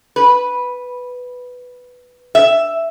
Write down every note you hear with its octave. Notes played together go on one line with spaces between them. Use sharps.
B4
E5